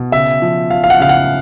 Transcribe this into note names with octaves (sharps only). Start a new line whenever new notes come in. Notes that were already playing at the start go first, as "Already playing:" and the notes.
Already playing: B2
C#3 E5
F3
F3 F5
F5
F#5
C#3 F5
F#5